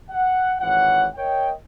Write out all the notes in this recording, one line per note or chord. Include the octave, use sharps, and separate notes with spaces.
F#5
G#1 E3 C#5 F#5
A#4 C#5 D#5 G5